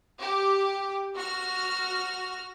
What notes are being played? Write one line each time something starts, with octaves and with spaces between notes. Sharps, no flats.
G4
F#4 F6